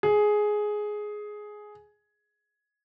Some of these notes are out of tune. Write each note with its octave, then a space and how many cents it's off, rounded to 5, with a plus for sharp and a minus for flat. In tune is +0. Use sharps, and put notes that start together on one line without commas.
G#4 +10